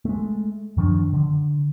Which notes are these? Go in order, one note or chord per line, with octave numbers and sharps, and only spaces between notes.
G#3 A3
F#2 D#3 F3 D4
D3